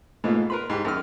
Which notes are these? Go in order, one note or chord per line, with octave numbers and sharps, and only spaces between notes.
G#2 B2 A3 A#3 F4
A#4 B4 B5 C6
G#2 G4
F#2 D#3 F6